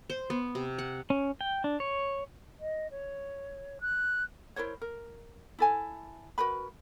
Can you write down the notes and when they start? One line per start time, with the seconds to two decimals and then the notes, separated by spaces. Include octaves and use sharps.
0.10 C5
0.30 B3
0.55 C3
0.78 F#5
1.10 C#4
1.41 G5
1.64 D4
1.80 C#5
2.60 D#5
2.91 C#5
3.81 F#6
4.56 E4 A#4 C5 C#5
4.81 A#4
5.59 E4 A4 G#5
6.38 F#4 A#4 B4 B5